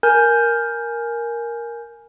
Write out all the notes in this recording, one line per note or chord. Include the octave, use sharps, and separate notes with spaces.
A#4 G#5 G6